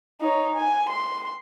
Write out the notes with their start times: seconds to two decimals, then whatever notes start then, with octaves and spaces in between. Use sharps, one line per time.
0.21 D#4 C#5
0.55 G#5
0.89 C6